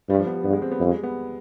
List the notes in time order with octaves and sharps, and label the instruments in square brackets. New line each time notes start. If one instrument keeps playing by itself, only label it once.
[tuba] G2 [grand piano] G3
[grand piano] F3
B3
G3
[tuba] G2 [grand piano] B3
[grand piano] G#3
C4
B3
[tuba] F2 [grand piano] G3
[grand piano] G#3
B3